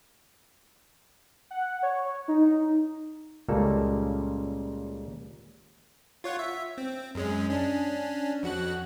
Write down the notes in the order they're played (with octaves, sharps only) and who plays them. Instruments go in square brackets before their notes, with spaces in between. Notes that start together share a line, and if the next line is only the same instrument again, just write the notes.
[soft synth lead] F#5
C#5
D#4
[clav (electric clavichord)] C#2 A#2 C#3 G3 A#3 A4
[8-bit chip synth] F4 C#5 F#5
E5
C4
F#2 G#3 C#4
C#4 D4
F2 F#4 F#6